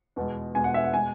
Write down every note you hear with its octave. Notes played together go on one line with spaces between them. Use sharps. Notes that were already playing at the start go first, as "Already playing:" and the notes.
E2 B2 G#3
E2 B2 G#3 G#5
F#5
E5
F#5
B2 G#3 G#5